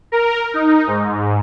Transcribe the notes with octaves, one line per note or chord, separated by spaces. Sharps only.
A#4
D#4
G#2